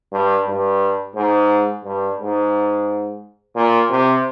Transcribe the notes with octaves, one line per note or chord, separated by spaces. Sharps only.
G2
G2
G#2
G2
G#2
A#2
C3